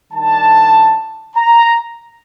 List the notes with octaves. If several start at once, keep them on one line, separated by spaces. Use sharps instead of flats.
D#3 G3 D4 A5
A#5